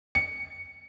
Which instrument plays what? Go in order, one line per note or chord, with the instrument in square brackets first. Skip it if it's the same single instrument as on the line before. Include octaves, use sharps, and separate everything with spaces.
[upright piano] C#7